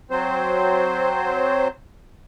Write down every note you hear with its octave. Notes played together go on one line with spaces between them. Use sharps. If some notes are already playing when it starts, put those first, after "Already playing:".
F#3 C4 C5